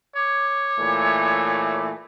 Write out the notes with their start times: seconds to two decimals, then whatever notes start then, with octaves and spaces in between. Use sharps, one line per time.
0.16 C#5 D6
0.79 A#2 E3 A3